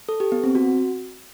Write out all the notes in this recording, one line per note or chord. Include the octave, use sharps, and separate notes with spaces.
A4
G4
B3
C4
F#4